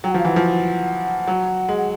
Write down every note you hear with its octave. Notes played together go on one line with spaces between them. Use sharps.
F#3 G5
F#5
F3 F5
E3 F#5
F3
F#3
G#3
F#5